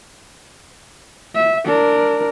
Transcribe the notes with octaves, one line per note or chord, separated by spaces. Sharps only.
E5
D4 A#4